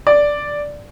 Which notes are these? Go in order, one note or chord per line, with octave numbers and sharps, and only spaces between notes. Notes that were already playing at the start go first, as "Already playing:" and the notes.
D5